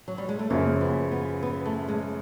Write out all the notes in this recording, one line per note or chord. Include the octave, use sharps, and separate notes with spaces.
F#3
G3
G#3
A3
F#2 C#3 F3 A#3
B3
B3
B3
A3
G#3